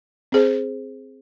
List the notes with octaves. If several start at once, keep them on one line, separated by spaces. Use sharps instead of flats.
C4 G#4 C5